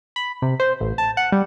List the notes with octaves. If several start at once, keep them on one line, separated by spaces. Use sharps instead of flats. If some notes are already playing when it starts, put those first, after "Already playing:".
B5
C3
C5
A1
A5
F#5
G3